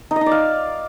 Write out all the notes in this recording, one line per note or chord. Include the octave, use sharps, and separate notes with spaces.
D#4
D#5
D#4
D5
F5